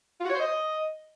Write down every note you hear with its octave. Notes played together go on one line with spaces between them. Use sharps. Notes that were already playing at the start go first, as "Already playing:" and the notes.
F4
F#4
C#5
C5
D#5